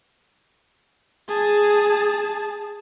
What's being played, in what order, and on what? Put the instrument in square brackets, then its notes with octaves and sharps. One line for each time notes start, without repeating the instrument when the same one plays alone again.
[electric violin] G#4 A5